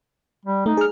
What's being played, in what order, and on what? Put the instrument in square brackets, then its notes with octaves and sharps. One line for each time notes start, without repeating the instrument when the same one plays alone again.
[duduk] G3
[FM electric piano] A3 [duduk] D#4
[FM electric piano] G#4 F6